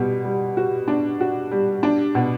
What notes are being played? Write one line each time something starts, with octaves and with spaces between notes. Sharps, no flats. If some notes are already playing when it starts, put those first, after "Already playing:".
Already playing: B2 G3
G3
F#4
D4
F#4
G3
D4
B2